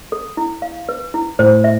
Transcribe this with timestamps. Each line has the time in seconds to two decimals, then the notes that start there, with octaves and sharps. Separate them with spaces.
0.12 A4
0.37 E4
0.62 F5
0.89 B4
1.14 E4
1.39 A2 C5
1.64 E5